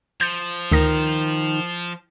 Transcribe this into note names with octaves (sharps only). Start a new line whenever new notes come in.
F3 G6 A6 C#7
D2 D#3 D#6 A#6